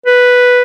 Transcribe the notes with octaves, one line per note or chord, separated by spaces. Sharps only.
B4